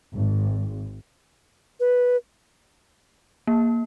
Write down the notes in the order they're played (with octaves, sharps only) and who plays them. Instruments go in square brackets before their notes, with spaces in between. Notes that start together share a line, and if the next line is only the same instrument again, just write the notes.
[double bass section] G#1
[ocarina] B4
[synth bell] A#3